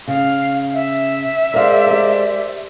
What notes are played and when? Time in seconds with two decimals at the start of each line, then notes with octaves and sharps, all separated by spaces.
0.08 C#3 F5
0.74 E5
1.54 G#3 A#4 C5 D5 F5
1.87 G4 A#4